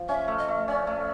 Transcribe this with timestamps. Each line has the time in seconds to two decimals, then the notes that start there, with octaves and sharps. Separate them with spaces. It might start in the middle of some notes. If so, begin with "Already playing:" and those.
Already playing: F3
0.08 C#4 E5
0.28 A3
0.38 D#5
0.48 A3
0.68 C#4 D5
0.87 A3